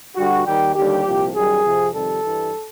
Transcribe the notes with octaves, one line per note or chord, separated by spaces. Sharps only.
G2 D3 G3 F#4
D#2 D#3 G3 G4
D#2 D3 G3 G4
C2 A#2 F3
F#2 D#3 G3 G#4
F2 C3 F3
F2 C3 D#3 G3 A4
G2 E3 G3